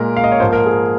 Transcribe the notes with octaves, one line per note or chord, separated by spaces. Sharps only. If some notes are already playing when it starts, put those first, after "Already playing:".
Already playing: A#2 G#3 A#4
F5
D#5
C#5
G#2 F3 A#3 C5
A#4
G#4